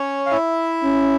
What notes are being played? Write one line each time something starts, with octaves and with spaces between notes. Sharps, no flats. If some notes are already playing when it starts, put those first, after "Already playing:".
Already playing: C#4 C#5
F5
E4 E5
C#4